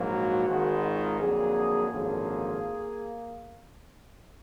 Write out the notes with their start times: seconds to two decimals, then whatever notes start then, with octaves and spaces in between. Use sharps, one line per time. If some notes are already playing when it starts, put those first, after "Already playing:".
Already playing: A#1 G#2 F#3 A#3
0.13 F#4
0.48 G#1 G#2 D#3 G#3
0.84 F4
1.19 F2 D3 F#3 A#3 G#4
1.90 G#1 F#2 D3 F3 A#3 G#4
2.61 A#3